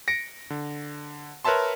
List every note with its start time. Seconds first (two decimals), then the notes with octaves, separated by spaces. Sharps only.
0.08 A#6 C#7 D7
0.50 D3
1.44 A#4 B4 C#5 E5 A5 C6